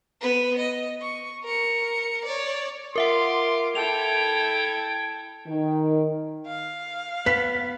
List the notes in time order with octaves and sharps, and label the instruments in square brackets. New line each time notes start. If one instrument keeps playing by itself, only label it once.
[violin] B3 B4
D#5
C#6
A#4 C#7
C#5 D5
[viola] F4 [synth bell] A#4 E5 F#5 [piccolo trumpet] C6 [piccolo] D6
[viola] E4 A4 [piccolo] G5 [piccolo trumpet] G#6 [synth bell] F7
[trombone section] D#3
[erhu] F5
[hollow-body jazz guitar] B3 [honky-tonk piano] B6